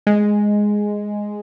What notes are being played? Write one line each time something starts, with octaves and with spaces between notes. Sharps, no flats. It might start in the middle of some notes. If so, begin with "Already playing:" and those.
G#3